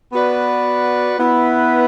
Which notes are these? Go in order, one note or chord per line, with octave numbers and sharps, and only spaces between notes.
B3 F#4 B4 D5
B3 E4 B4